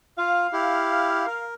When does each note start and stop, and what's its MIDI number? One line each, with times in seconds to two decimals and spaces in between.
0.18 0.47 65
0.18 1.44 77
0.53 1.26 64
0.53 1.26 67
1.26 1.54 70